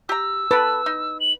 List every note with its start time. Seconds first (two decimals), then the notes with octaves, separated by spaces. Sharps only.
0.09 G4 A#5 E6
0.51 A4 B4 G5 A5
0.86 D#4
1.20 F#7